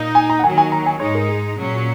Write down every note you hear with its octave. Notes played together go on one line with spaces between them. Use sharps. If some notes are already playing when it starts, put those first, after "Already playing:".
Already playing: A#2 A#3 D#4
G#5
A#5
F#5
D#2 D#3 F#3 G#5
G#5
A#5
G#5
G#2 G#3 D#4 C#5
A#4
G#4
A#2 F#3 C#4